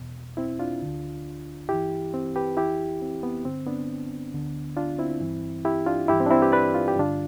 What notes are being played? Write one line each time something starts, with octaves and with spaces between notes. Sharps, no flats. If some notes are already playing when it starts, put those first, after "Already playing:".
Already playing: E2 B2
C4 E4
D4 F4
D2 D3
G2 E3 E4 G4
C4
G4 B4
F2 E3 E4 G4
C4
B3
G2 D3 C4
B3 D4
D2 D3
D4 F4
C4 E4
G2 E3
E4 G4
D4 F4
G2 E3 E4 G4
C4
D4
C4 E4
G4 B4
B4 D5
F4
G4
G2 D3 D4 F4